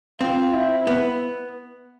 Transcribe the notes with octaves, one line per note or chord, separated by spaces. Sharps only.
C4 F4
E4
B3